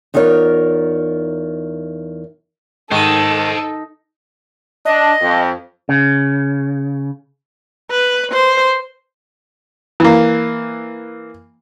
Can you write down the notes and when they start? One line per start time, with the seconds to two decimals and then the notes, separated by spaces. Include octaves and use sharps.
0.14 E2 D#4 F4 A#4 C#5
2.91 G#2 D#3 A4 C5 D#5
4.85 D4 D#5
5.21 F2
5.89 C#3
7.91 B4
8.31 C5
10.00 E3 A#3